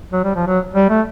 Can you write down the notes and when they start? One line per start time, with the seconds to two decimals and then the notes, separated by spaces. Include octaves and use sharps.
0.12 F#3
0.24 G3
0.35 F3
0.47 F#3
0.74 G3
0.89 A3